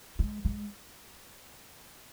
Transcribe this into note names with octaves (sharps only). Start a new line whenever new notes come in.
G#3
G#3